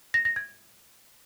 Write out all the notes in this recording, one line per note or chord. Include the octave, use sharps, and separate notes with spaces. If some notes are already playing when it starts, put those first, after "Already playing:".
A#6
A#6
G#6